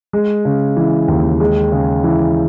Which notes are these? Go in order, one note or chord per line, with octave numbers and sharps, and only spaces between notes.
G#3
C#3
E3
D#2
G#3
C#3
E3